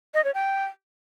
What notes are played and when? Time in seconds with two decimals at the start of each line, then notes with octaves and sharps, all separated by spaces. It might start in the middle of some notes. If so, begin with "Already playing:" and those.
0.14 D#5
0.24 C#5
0.34 G5